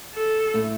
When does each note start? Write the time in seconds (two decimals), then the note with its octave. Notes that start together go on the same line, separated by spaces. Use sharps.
0.15 A4
0.54 A2 A3